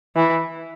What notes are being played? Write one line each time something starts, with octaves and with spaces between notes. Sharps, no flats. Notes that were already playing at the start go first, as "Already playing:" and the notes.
E3